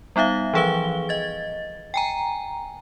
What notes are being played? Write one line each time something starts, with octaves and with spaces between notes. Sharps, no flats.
G3 B3 D#4 E5 F5
E3 F3 G#4 B4 F5 G7
D#5 A6
G5 G#5 A#5